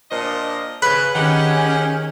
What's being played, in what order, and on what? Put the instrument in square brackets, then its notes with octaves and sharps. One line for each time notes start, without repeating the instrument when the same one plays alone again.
[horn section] A#2 D4 D#5 [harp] C5
[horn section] C#3 [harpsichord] B4
[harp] D#3 C5 [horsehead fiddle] C#4 [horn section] G4 G#4 F#5